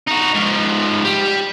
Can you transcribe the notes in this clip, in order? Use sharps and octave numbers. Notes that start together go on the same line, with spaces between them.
D#4 F#4
G#2 F3
G3